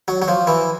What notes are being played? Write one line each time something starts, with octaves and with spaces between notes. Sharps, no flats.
F#3
F#3
F3
E3